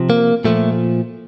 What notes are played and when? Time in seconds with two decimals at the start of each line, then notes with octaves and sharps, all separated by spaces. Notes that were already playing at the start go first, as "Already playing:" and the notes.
Already playing: C3 F3
0.10 A#3
0.45 A#2 F3 A3